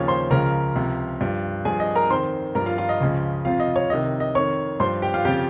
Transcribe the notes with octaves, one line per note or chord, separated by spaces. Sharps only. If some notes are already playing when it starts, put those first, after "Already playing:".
Already playing: D#2 C#3 F3 C#5 C#6
C5 C6
C#2 C#3 F3 A#4 A#5
C#2 C3 F3
G2 F3
G2 F3 G#4 G#5
D#5
A#4 A#5
F2 D#3 C5 C6
G2 F3 A#4 A#5
F4 F5
F4 F5
D#5
C#2 C#3 F3
F2 C3 F3 F4 F5
D#5
C#5
C2 C3 D#3 D#5
D#5
F2 D#3 C#5 C#6
G2 F3 C5 C6
G4 G5
F4 F5
F2 C#3 F3 G4 G5